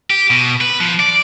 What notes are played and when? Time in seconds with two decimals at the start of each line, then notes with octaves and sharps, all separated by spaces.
0.10 G4
0.31 B2
0.61 B4
0.80 F3
1.00 D5